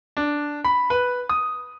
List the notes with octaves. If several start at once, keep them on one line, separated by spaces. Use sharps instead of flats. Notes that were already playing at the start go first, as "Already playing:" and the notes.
D4
B5
B4
D#6